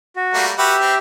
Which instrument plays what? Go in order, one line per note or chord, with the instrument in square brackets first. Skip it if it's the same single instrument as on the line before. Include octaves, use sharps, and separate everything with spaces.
[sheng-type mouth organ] F#4
[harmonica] G3 A3 A#3
[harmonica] F#4 B4 [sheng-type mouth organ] G4 E5
[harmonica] C4